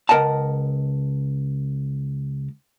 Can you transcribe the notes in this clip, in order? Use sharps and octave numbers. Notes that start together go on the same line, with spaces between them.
C#2 A#4 D#5 F#5 A5